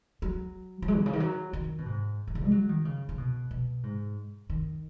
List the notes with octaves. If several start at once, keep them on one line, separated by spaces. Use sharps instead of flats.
F#3
F#3
G#3
B2
C#3
D#3
F#3
D#3
B2
G#2
D#3
C#3
G#3
F#3
D#3
C#3
C#3
B2
B2
G#2
D#3